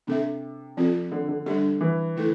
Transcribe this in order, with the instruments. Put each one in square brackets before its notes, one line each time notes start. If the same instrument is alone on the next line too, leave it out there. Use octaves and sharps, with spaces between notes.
[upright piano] C3 [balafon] D4 A4 E5
[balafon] F3 C4 F4 A4
[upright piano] D3
D3
[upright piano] D3 [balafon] G3 D4 G4
[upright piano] E3
[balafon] D3 A3 E4 A4